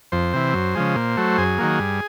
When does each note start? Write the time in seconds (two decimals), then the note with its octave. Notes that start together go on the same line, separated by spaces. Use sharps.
0.12 F2 C5
0.33 C3 E3
0.54 F#2
0.75 C#3 F3 G#3
0.96 A#2
1.17 F#3 A3
1.38 F#2 G#4
1.58 D#3 F#3 A#3
1.79 G2